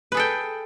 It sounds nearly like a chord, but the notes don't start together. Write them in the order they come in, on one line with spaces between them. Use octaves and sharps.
B4 G#4 A4 G5